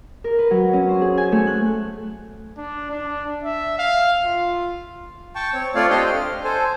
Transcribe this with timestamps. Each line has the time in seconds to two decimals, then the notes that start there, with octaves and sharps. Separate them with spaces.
0.24 A#4
0.39 B4
0.51 F#3
0.73 C#4
0.89 C5
1.01 G#4
1.17 G#5
1.32 A3
1.47 F#6
2.57 D4
2.91 D4
3.43 E5
3.79 F5
4.25 F4
5.35 G5 A5 C#6
5.53 C4 C#5
5.75 A3 C4 F4 C#5 D5 F5
5.90 D4 G4 C5 D#5 G5 C6
6.06 F6
6.44 A4 C5 G#5